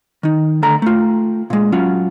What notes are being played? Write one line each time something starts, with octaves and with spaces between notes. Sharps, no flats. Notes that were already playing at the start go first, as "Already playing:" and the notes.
D#3 D#4
D2 D3 A4 A#5
A3 F4
A#2 G#3
F#3 C#4 F4